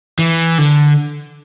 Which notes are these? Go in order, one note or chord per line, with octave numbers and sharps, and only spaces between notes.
E3
D3